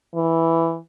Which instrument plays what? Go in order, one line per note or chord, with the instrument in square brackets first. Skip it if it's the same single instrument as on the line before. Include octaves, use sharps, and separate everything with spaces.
[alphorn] E3